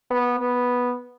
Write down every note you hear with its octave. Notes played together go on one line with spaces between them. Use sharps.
B3
B3